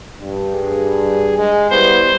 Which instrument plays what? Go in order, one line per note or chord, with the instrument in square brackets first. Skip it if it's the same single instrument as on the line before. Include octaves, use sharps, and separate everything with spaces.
[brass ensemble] G2
[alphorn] G#4
G#3
[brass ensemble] G3 E4 [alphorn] B3 [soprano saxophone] C5